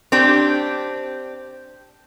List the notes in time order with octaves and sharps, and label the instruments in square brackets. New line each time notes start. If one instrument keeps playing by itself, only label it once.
[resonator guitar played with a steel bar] C4 D4 G4